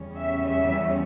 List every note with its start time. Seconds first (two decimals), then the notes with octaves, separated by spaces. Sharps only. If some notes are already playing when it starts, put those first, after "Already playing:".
Already playing: E2 C#3 G3 C#4
0.18 E5
0.48 E5